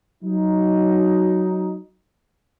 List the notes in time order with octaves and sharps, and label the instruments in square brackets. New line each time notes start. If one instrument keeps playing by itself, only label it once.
[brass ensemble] F#3 D#4